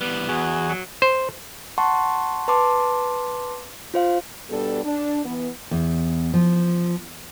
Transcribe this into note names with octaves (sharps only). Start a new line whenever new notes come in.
E3 G3 B3
E2 F#4 G#4
F#3
C5
F#5 A5 C6 C#6
B4 A5 C6 D6
F4 C5 F5
B2 G3 B3 D4 A4
D4
E3 B3
E2
F3